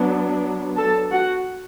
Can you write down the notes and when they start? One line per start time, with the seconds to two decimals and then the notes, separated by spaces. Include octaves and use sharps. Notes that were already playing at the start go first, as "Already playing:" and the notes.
Already playing: F#3 B3 D4
0.77 A4 A5
1.12 F#4 F#5